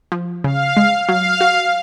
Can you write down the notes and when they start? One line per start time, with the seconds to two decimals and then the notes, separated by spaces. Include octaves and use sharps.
0.12 F3
0.44 C#3 F5
0.77 G#3
1.08 F#3 F5
1.41 F#4